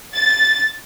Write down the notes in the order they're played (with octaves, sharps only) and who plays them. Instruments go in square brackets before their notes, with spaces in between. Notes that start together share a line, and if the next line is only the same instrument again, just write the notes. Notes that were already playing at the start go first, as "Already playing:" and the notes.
[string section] A6